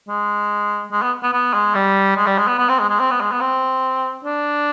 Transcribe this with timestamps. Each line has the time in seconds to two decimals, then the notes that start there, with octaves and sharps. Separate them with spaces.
0.09 G#3
0.92 G#3
1.02 B3
1.23 B3
1.33 B3
1.54 G#3
1.75 G3
2.17 G#3
2.27 G3
2.38 G#3
2.48 B3
2.58 B3
2.69 C4
2.79 G#3
2.89 G#3
3.00 C4
3.11 B3
3.21 G#3
3.32 B3
3.41 C4
4.25 D4